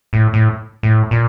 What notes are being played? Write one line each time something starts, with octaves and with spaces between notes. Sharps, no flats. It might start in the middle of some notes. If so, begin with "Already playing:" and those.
A2
A2
A2
A#2